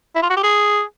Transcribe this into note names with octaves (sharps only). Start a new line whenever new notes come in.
E4
F4
F#4
G4
G#4